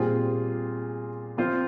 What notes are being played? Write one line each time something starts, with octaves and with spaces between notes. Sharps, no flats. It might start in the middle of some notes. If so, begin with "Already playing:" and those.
Already playing: A#2 G3 C4 F4 G#4
F3 C4 F4 C5